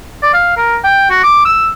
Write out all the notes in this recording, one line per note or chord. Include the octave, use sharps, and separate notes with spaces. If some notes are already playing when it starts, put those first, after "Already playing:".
D5
F5
A#4
G5
F#4
D6
E6